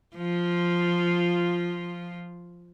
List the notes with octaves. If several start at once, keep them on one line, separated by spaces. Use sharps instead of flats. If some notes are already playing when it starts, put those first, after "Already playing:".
F3 F4